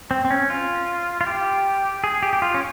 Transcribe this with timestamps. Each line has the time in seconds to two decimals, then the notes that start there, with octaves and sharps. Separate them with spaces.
0.11 C4
0.25 C4
0.31 C#4
0.50 F4
1.21 F4
1.27 G4
2.04 G#4
2.23 G4
2.33 G4
2.42 F4
2.54 C#4